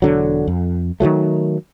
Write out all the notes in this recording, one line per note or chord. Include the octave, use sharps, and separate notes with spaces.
E1 D3 F#3
F2
D#3 F3 F#3 A3